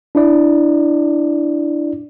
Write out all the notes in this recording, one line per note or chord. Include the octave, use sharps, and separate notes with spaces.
D4 E4 D5